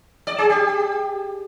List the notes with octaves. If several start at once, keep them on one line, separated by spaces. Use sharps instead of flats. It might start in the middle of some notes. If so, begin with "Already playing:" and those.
D5
G#4
G4